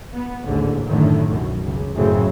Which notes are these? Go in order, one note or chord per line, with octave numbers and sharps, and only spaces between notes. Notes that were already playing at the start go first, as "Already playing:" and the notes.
B3
A1 D#2 G#2 D3
F#2 A2 D3 D#3
C2 F#2 B2
C#2
F#2 A2 C#3 C4